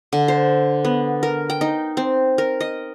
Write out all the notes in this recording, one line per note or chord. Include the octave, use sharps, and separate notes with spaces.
D3
C5
B3
A#4
G5
D#4
C4
A#4
D#5